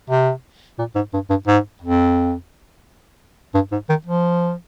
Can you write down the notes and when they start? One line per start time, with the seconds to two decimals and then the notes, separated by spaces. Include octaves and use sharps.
0.10 C3
0.79 A#2
0.95 G#2
1.14 G2
1.30 G2
1.47 G#2
1.82 F2
3.54 G2
3.72 G#2
3.89 D#3
4.06 F3